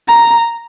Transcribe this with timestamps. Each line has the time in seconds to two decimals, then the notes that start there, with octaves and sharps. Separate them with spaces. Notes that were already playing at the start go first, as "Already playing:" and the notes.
0.08 A#5